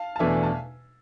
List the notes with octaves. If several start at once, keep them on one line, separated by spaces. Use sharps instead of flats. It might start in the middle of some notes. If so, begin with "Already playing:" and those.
Already playing: F5 A5
A5
E2 B2 A3 D4 E5 G#5
A5